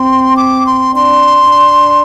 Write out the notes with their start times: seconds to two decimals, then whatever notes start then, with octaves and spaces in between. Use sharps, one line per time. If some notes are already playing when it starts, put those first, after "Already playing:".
Already playing: C4 C6
0.37 D6
0.66 C6
0.95 D4 C6
1.55 D4